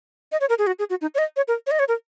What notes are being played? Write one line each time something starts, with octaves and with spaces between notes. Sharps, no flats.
D#5
C#5
A#4
G#4
F#4
G#4
F#4
D#4
C#5
D#5
C#5
A#4
C#5
D#5
C#5
A#4